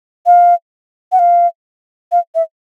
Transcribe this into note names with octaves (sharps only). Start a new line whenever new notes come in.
F5
F#5
F5
F5
E5